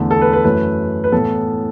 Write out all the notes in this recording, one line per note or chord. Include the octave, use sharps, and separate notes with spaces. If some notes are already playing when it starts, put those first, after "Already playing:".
Already playing: E2 D3 A3
A4
B4
B4
F#2 E3 A3 B4
B4
A2 E3 B3 A4